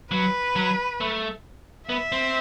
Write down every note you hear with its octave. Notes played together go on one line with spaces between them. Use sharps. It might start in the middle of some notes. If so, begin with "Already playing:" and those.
F#3 B4
F#3
A3
B3 E5
C4